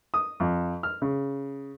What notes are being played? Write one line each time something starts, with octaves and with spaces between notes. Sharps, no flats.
D#6
F2
F6
C#3